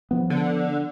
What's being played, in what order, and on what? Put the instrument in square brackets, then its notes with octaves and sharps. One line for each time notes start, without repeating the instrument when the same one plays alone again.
[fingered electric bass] F3 B3
[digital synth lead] D3